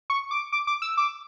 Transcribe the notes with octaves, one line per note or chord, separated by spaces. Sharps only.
C#6
D6
D6
D6
E6
D6